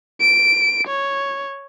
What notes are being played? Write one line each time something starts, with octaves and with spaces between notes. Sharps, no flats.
D7
C#5